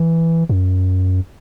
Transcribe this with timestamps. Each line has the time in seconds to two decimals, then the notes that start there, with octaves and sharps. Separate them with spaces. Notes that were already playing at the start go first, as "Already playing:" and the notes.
Already playing: E3
0.49 F#2